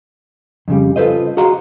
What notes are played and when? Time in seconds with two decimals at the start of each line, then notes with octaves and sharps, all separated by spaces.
0.68 F2 C#3 G3
0.96 F4 A4 B4 C5 D#5
1.37 F#4 G#4 D#5 F5 A#5 C6